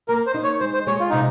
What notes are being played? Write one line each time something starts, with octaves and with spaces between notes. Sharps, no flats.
A#3 A#4
C5
D#4
C#5
G#3 C5
C5
G#3 C#5
F4
C3 D#4